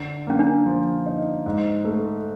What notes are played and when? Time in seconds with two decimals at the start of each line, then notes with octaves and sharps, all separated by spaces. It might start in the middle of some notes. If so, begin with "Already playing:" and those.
Already playing: D3
0.27 A#3 C#4
0.39 D4
0.66 F3
1.06 D#4
1.46 G#2
1.85 A3